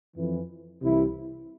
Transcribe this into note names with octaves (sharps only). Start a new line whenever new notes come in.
F2 E3
C2 C3 E3 E4